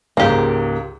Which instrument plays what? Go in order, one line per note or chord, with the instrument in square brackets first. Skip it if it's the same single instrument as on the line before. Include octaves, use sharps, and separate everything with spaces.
[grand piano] C#2 G#2 [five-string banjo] A#3 G4